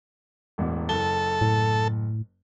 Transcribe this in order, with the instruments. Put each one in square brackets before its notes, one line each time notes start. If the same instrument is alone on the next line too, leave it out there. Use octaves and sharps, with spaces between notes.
[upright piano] E1 A1 E2
[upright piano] F#1 A5 G7 [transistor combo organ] A4
[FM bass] A2